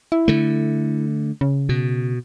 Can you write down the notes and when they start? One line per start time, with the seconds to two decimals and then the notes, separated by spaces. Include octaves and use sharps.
0.12 E4
0.28 D3 A3
1.41 C#3
1.69 B2